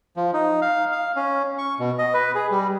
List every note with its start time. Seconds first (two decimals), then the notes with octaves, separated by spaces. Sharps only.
0.17 F3
0.33 D#4
0.62 F5
0.92 F5
1.16 C#4
1.58 C#6
1.79 B2
1.98 D#5
2.14 B4
2.35 G#4
2.51 G3